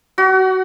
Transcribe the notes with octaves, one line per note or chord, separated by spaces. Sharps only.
F#4